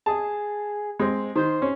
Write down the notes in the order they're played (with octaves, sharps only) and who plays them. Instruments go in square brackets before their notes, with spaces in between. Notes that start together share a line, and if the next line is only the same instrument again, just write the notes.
[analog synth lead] G#4 [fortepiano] A5
[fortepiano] G#3 C4
[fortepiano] D#3 [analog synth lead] C5
[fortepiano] C#4